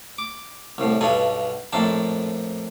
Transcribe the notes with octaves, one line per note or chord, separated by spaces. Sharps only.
D6
C2 A2
B1 G2 B2 A4 G#5
A#1 F2 A2 A#3 A5